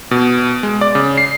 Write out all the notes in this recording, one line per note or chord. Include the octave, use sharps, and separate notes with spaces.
B2
G#3
D5
C#3
C7